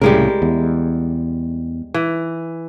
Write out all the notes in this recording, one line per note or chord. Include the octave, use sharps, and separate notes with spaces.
C2 A2 C#3 G3 G#3 A#4
E2
E3